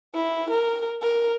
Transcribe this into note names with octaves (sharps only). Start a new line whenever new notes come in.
E4
A#4
A#4